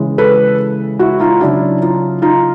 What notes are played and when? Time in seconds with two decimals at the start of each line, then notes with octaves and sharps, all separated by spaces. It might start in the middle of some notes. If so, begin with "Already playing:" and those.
Already playing: C#3 E3 G#3
0.18 A4 B4
0.99 E4 F#4
1.20 D#4 F4
1.41 C#3 F#3 D4 E4
1.82 D#4 F4
2.22 D#4 F4